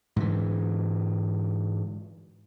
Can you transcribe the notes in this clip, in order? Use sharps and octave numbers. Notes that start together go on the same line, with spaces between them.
G#2 D3 E3